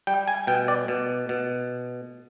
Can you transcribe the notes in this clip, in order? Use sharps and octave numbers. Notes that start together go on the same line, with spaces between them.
G3 G5
G#5
B2 G5
D5
B2
B2